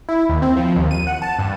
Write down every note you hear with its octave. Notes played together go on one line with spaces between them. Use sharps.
E4
D#2
C4
F3
D#2
D#7
F#5
A5
G2